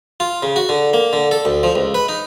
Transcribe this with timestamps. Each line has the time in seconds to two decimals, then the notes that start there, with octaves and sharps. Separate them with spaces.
0.20 F4
0.43 C#3
0.56 F#4
0.69 D3
0.93 A#3
1.13 D3
1.31 A4
1.45 D2
1.63 F3
1.75 C#2
1.94 B4
2.09 D#4